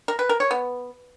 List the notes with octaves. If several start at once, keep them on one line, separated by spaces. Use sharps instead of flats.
A#4
B4
A#4
C#5
B3